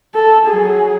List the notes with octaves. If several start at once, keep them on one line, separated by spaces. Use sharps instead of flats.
A4
F#3 G#4